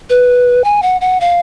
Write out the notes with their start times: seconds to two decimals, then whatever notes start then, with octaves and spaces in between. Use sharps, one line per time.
0.10 B4
0.64 G#5
0.82 F#5
1.01 F#5
1.21 F5